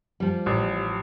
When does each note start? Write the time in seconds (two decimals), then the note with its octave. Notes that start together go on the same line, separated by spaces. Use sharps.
0.20 F3 G3
0.46 A1